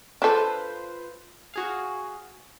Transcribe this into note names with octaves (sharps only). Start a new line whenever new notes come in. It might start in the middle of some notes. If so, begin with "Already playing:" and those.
D4 F4 A4 B4 C5
F#4 G#4 F5